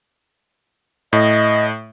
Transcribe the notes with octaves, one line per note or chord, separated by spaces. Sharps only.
A2 D#5